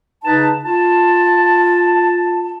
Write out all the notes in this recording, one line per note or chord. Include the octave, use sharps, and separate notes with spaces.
C#3 D#4 B4 A5
F4 A5